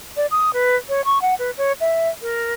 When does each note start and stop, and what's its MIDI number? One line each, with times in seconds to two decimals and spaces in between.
0.17 0.26 74
0.31 0.51 87
0.53 0.76 71
0.89 1.02 73
1.05 1.21 85
1.22 1.35 78
1.39 1.51 71
1.58 1.72 73
1.80 2.09 76
2.22 2.54 70